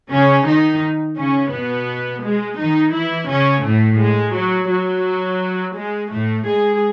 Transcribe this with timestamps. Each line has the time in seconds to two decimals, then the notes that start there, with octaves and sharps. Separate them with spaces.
0.11 C#3 C#4
0.47 D#3 D#4
1.18 C#3 C#4
1.53 B2 B3
2.24 G#3
2.59 D#3 D#4
2.94 E3 E4
3.30 C#3 C#4
3.66 A2 A3
4.01 G#3
4.36 F#3
4.71 F#3
5.78 G#3
6.13 A2 A3
6.48 G#3 G#4